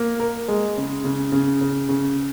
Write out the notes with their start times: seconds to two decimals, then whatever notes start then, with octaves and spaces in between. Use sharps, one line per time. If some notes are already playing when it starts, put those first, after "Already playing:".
Already playing: A#3
0.20 A#4
0.48 G#3
0.77 C#3
1.05 C#3
1.32 C#3
1.61 C#3
1.89 C#3